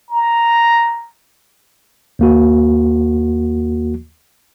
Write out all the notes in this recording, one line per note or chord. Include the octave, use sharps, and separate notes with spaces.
A#5
D#2 A#3 F#4